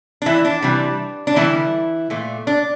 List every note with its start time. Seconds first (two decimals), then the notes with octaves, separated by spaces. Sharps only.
0.22 D4
0.26 E3 E4
0.45 D4
0.62 C3 E3 G3
1.27 D4
1.36 D3 E3 G3 A#3 E4
2.10 A#2 A3
2.47 D4